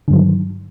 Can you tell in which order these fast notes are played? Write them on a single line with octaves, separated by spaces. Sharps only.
D3 G2 F#3 D#3